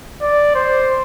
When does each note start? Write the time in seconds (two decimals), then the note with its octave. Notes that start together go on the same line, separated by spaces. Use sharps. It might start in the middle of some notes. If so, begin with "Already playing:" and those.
0.22 D5
0.55 C5